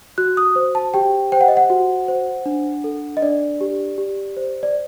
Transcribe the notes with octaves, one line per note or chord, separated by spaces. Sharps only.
F#4 F#6
D#6
C5
A5
G4 G5
C5 G5
F#5
D#5
F#5
F#4
C5
D4
A4
D#5
D4 D5
G4
G4
C5
D5